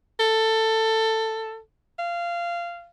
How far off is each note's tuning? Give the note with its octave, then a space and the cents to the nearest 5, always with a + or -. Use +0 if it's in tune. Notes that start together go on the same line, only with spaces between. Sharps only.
A4 +15
F5 -15